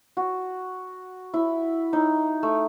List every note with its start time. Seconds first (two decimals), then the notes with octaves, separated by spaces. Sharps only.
0.17 F#4
1.34 E4
1.93 D#4
2.43 A3